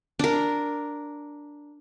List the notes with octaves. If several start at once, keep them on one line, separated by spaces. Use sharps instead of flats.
D4 A#4